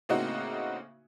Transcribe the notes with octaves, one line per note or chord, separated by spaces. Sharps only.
A2 C#3 A#3 C4 D#4 F#4